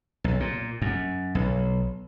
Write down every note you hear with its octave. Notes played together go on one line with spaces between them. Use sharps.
B1
A#2
F#2
B1